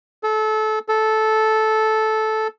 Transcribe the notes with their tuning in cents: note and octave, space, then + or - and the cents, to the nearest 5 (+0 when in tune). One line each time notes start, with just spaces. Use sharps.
A4 -25
A4 -10